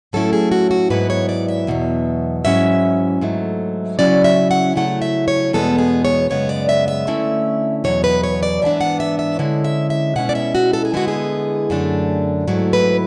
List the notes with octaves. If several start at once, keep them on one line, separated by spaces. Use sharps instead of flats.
A2 F#3 A3 C#4 E4 A4
G#4
F#4
F#4
G#2 F#3 B3 E4 B4
C#5
D5
E5
E2 B2 F#3
G#2 F#3 C#4 E4 E5
G#2 F#3 A3
C#3 F#3 C#4 E4 D5
E5
F#5
C#3 F#3 A3 E4 F#5
E5
C#5
E2 B2 G#3 B3 A4
G#4
C#5
F#2 C#3 G#3 B3 C#5
D5
E5
E5
D3 A3 C#4 E4
E2 B2 F#3 C#5
B4
C#5
D5
G#2 E3 B3 D4 E5
F#5
E5
E5
D3 G#3 C#4 E4
E5
E5
B2 G#3 C#4 E4 F#5
D5
E5
F#4
A4
G#4
D3 G#3 B3 E4 F#4
G#4
F#2 D3 A3 D4
G#2 F#3 A3 E4
B4